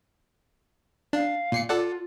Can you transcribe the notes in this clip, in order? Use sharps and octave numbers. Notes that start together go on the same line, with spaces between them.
D4 F5
A#2 C7 C#7
F4 A4 D5 F#5